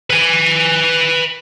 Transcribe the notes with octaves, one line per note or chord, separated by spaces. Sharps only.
B4 G#5